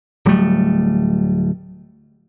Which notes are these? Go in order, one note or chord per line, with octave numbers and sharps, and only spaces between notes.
D1 F#3 G3 A3